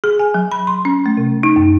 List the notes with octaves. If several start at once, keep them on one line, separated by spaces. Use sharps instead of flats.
G#4
G#5
F#3
B5
C6
C#4
A3
C3
D#4
F#2